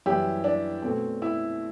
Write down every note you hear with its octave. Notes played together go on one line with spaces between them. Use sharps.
F#2 E3 G3 E4 G4
D4
B2 A3 C4
E4